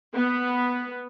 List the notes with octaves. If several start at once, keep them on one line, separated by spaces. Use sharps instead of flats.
B3